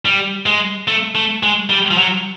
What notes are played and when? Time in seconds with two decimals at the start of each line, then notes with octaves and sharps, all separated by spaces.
0.05 G3
0.46 G#3
0.88 A3
1.15 A3
1.43 G#3
1.70 G3
1.91 F3
1.98 F#3